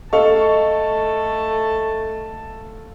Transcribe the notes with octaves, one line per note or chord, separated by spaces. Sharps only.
A3 A4 D#5 F5 A5 C#6